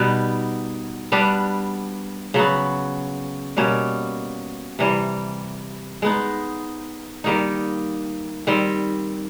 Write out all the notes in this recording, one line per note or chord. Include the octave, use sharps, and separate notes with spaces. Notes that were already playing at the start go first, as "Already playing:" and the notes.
Already playing: B2 G3 B3 D#4
G3 B3 D4 G4
C#3 F#3 B3
B2 G3 A#3 C#4
C3 E3 G3
G#3 B3 D#4
D#3 G3 A#3 D#4
D#3 G3 C4